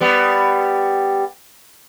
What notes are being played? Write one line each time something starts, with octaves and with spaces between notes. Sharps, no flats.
G3 B3